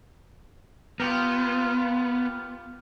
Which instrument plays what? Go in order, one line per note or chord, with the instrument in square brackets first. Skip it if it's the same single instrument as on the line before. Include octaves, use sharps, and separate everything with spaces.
[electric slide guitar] B3 [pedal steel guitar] F4 G4 A#4